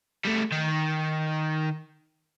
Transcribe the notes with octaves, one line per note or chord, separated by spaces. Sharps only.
G3 A3
D#3